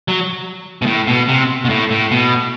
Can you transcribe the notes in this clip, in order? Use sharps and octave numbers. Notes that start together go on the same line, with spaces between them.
F#3
B2
A2
B2
C3
B2
A2
A2
B2